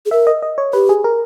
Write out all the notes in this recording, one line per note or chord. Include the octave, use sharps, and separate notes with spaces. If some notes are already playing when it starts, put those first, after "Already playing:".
G#4
A#4 E5
D#5
D#5
C#5
G4 B4
G#4
A#4